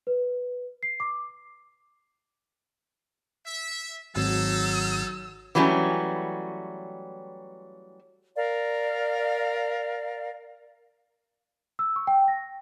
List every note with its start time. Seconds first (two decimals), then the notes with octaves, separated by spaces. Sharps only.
0.07 B4
0.83 C7
1.00 D6
3.45 E5
4.16 G#1 F#3 D#4 G#4 A4 E6
5.55 E3 F#3 G3 A3 C#4
8.36 A#4 D5 F5
11.79 E6
11.96 C#6
12.07 G5
12.28 A#6